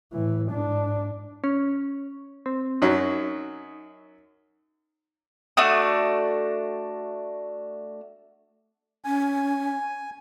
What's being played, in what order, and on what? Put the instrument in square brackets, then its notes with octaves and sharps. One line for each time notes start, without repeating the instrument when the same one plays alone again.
[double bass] A2 E3
G#2 D4
[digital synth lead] C#4
C4
[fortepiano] F#2 F#3 [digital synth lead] D#4
[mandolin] A3 D4 F#4 D#6
[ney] C#4 [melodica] G#5